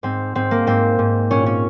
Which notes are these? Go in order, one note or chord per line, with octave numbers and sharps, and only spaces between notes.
G#2 C4
G#2 C4
A#3
G#2 C4
G#2
A#2 C#4
C#4